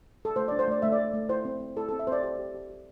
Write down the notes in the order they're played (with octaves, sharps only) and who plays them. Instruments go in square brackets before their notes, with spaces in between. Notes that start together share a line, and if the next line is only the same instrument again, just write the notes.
[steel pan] A4
A3 C5
D4 D5
C5
A3 D5
A3 E5
D5
A3
A3
E4 C5
C4
C4
E4 A4
C4 A4
E5
C4 C5 D5
G4 C5
G4
G4
G4